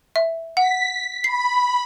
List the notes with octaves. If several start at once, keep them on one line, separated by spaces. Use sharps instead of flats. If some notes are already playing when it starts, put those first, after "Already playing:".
E5
F#5 B6
B5 C7